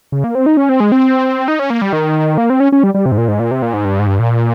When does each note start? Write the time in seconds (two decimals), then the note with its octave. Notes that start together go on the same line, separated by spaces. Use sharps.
0.12 C#3
0.24 A#3
0.35 C4
0.46 D#4
0.57 C#4
0.69 C4
0.80 G#3
0.92 C4
1.48 D#4
1.59 C#4
1.70 A#3
1.82 G3
1.93 D#3
2.38 A#3
2.50 C4
2.60 C#4
2.72 C#4
2.83 G3
2.94 G3
3.06 C3
3.12 G#2
3.18 A#2
3.28 G#2
3.40 A#2
3.51 C3
3.62 A#2
3.74 G#2
3.85 G2
3.99 G#2
4.07 G2
4.19 A#2